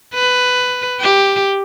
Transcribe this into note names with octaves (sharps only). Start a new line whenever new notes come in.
B4
G4